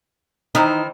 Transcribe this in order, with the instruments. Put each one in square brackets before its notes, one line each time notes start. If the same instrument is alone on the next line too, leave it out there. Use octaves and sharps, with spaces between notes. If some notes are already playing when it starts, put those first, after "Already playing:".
[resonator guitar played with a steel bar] D#3 E3 C5 [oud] D#4